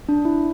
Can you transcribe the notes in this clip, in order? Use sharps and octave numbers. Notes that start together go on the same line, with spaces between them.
D4
E4